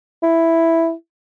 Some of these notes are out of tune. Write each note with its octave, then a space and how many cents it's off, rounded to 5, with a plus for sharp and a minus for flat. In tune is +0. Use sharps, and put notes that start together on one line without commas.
E4 +0